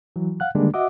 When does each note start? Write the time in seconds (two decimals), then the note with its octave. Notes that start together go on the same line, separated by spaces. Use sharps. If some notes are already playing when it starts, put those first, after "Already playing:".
0.16 E3 F#3
0.40 F5 F#5 F#6
0.55 D3 D#3 G3 G#3 A#3 D4
0.74 F#4 D#5 E5 F#5 D6